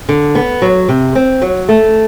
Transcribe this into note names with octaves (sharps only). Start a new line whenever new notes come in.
D3
B3
F#3
C3
C4
F#3
A3